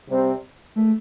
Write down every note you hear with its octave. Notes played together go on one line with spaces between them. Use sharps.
C3 G3 C4
A3